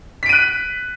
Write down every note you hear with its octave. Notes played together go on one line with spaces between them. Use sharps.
F#6 B6 D7 D#7